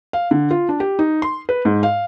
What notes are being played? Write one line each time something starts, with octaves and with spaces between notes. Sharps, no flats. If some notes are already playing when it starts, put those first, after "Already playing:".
F5
D3
F4
D4
G4
D#4
C6
B4
G#2
F5